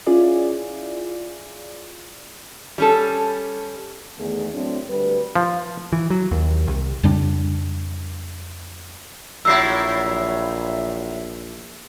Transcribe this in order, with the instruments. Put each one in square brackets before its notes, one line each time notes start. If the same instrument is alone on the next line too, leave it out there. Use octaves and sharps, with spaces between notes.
[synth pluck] C#4 E4 F4 G#4 D5
[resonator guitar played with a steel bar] G3 C#4 A4
[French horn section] E2 D#3 A3 B3 G#4
A2 F#3 C4 D4
D2 G3 B4
[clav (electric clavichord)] F3
[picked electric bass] E3
F#3
D#2
C2
[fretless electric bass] F2 C#3 G3 D4
[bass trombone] A#1 [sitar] A2 F#3 E4 [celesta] E6 C7